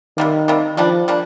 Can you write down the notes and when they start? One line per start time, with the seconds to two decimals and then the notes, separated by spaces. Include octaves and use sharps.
0.17 C3 D#3 G3 A#3
0.48 C3 G3 A#3
0.77 F3 G3 A#3 D4
1.08 G3 A#3 D4